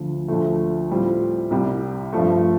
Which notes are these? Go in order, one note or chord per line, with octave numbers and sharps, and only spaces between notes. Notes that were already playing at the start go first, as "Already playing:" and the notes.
Already playing: D2 D3 F3
D2 D3 F3 A3
A2 G3 C4 F4
C2 C3 G3
G2 F3 A3